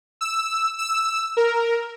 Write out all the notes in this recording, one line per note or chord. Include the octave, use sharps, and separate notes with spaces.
E6
E6
A#4